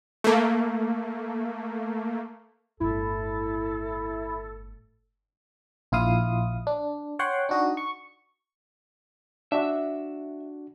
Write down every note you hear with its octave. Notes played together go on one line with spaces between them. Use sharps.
A3 A#3
G1 A2 E4 A4
A#1 E4 F4 F5 D#6
D4
C#5 F#5 G5 C6
D4 D#4 F#4 D#5
C#6
D4 F#4 E5